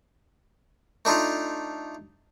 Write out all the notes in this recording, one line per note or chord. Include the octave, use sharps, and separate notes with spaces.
A3 D4 D#4 F4